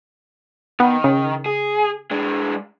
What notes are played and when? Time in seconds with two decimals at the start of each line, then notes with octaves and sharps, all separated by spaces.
0.80 D#3 B3
1.04 C#3
1.46 G#4
2.11 G#3 D4